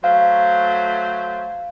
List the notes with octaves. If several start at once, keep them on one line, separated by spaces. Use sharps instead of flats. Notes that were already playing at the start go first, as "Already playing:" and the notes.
F#3 A3 C5 F5